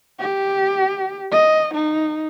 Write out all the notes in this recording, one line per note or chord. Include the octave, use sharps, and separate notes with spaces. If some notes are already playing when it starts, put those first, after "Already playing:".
G4
D#5
D#4